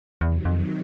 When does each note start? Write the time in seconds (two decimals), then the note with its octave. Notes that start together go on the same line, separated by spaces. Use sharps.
0.20 E2 C3 D#3 F#3
0.45 F2